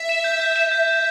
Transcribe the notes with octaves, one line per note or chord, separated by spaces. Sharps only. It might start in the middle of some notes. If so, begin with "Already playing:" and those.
Already playing: E5
E7
G6
G6
E7
E5 G6
G6